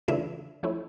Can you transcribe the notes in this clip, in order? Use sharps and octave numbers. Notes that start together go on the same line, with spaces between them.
C#3 E3 A3 D4 F4 E5
F3 A3 C#4 E4